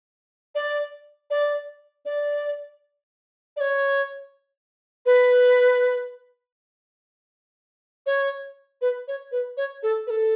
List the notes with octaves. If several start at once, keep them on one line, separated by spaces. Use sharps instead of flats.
D5
D5
D5
D5
C#5
B4
C#5
B4
C#5
B4
C#5
A4
B4
A4